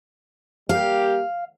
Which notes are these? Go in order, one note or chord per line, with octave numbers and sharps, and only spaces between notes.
G3 A#3 G4 F5